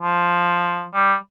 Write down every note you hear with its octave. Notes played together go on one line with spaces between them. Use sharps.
F3
G3